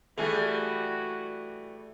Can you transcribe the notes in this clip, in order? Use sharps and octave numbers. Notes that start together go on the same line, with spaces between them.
E3 G3 A3 F#4 G#4